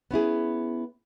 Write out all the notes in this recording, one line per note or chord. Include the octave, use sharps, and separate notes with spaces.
B3 C#4 E4 G#4